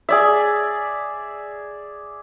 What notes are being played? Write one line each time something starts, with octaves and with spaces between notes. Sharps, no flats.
G#4 D5 E5